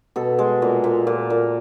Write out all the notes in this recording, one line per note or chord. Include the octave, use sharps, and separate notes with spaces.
B2 A4
G#3 A4
A#2
A#2
A#2
A#2